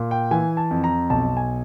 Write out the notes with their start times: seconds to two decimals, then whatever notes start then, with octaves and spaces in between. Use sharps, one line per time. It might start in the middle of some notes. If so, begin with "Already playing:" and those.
Already playing: A#2
0.11 G5
0.31 E3 G#5
0.57 A5
0.71 F2
0.84 A#5
1.10 B1 A5
1.37 G#5